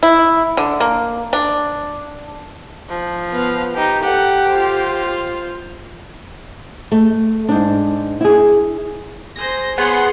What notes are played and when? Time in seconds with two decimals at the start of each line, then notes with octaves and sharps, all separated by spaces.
0.03 E4
0.57 D3
0.80 A#3
1.33 D4
2.89 F3
3.32 B3 F5
3.74 D#4 G4
4.03 G4 A4 F#5
4.48 F4 C5
6.92 A3
7.49 G#2 D4
8.21 E4 G#4
9.36 G#4 C5 A#6
9.78 B3 G#4 C#5 F#5 C6